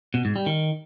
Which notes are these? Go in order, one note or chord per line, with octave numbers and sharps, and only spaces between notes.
B2
G#2
G3
D#3